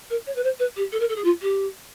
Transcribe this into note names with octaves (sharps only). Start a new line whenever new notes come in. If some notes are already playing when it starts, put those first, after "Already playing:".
A#4
C#5
B4
C5
B4
G4
A4
A#4
A4
G#4
F4
G4